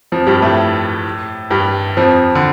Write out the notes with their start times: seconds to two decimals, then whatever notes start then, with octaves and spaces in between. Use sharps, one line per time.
0.12 F2 F3
0.27 G2 G3
0.42 A2 A3
1.51 G2 G3
1.97 F2 F3
2.35 D3